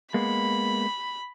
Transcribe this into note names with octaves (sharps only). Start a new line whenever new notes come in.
G#3 A#3 B3 B5